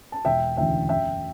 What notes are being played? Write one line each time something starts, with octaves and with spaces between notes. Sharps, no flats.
A5
E1 E5 G5
D2 C#3 E3 E5 G5
F#2 E5 G5